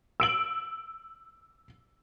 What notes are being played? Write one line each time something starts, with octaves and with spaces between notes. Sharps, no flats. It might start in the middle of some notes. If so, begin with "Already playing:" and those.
E6 D7 F#7